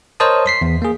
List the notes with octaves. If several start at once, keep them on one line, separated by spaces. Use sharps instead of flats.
A#4 C5 C#5 D#5 A5 D#6
C6 B6 C7
E2
A#3 G#4